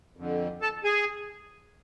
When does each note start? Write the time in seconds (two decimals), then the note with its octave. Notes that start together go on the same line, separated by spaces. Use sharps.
0.17 F2 D3
0.61 A4 A5
0.84 G#4 G#5